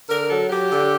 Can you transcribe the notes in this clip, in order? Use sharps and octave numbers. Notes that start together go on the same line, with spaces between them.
D3 A#4
F#3 A4
F#3 G4
D3